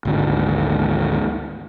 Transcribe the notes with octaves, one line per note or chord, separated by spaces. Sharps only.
G#1 D2